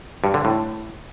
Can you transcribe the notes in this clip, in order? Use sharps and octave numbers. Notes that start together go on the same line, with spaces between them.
G2
D3
A2